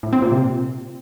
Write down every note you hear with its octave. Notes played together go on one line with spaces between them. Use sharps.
A2
C4
A#2
C3